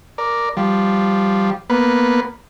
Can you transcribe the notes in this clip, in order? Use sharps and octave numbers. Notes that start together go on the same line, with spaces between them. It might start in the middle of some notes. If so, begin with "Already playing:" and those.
A#4 D5
F3 G3
A#3 B3 B4